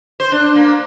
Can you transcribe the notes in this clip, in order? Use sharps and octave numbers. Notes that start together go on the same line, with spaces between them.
C5
D4
A#3